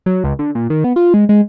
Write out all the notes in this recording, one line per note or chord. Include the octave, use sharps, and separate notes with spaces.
F#3
C#2
D3
A#2
D#3
B3
F4
G#3
G#3